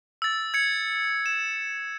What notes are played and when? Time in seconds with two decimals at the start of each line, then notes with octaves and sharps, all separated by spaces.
0.22 E6 A6
0.54 G#6 C#7
1.26 E7